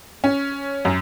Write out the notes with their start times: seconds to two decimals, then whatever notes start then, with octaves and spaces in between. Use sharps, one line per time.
0.24 C#4
0.85 F#2